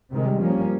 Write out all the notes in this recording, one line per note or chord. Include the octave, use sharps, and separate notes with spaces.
C3 D#3 G#3
G3
F3 A#3 C#4